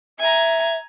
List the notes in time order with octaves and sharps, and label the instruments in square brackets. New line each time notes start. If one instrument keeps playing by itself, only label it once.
[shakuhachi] E5 [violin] G#5 A#5